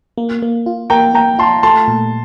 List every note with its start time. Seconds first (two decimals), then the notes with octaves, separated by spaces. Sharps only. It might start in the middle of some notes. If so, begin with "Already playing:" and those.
0.18 A#3
0.42 A#3
0.66 F4
0.90 A#3 G5 A#5
1.14 A#3 G5 A#5
1.39 F4 A5 C6
1.63 A3 A5 C6
1.88 A#2